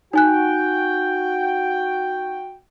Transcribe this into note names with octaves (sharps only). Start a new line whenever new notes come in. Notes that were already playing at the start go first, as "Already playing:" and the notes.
D#4 F#4 G5 G#5 F#6